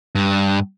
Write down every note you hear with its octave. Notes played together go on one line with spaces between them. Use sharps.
G2